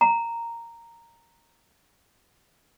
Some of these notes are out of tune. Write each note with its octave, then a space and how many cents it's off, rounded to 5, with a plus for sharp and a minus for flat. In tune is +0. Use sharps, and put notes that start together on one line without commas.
A#5 -10